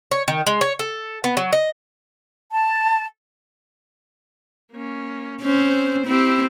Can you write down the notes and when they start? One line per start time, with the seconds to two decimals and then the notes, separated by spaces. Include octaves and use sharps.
0.11 C#5
0.28 D#3
0.47 G#3
0.61 C#5
0.79 A4
1.24 B3
1.37 F#3
1.53 D#5
2.52 A5
4.72 A#3 C#4
5.42 C4 C#4 C5
6.07 C4 E4 G4